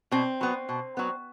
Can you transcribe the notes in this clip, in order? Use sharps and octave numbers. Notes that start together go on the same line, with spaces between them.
B2 C4
F#3 B3
B2
F#3 B3